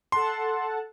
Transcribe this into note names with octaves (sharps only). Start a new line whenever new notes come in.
A4 F#5 A5 C6